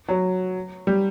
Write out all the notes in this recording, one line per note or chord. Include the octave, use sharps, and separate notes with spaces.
F#3
G3